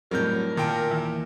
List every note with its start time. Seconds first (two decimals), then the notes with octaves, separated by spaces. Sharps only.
0.11 F2 A2 F#3 G3 A#4 G6
0.57 A#2 D#3 G5 A5 D7
0.91 D#2 E3 E5